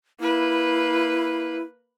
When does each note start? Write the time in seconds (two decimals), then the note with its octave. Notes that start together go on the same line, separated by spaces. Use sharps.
0.20 A#3 E4 B4